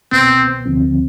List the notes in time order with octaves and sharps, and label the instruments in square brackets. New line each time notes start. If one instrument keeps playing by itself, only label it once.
[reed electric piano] C2 B2 B3 [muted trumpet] C4
[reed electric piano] D2 D3 F3 C4